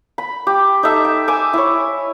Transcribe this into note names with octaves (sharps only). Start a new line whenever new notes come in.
B5
G4
D#4 A4 E5
G5
G#5 D6 E6
E4 C#5